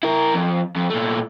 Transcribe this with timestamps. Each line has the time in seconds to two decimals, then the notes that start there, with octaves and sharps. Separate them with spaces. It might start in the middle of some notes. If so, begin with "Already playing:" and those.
0.03 E4 A#4
0.34 F2
0.76 F2
0.90 A#2 A3